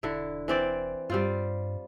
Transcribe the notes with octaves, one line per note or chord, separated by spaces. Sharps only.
E1 D3 E4
E3 C4 D5
G2 G3 C4 F4